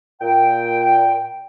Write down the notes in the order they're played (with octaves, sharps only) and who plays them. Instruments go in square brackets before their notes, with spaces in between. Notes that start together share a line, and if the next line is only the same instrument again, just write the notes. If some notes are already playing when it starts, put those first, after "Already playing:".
[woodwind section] A#2 G5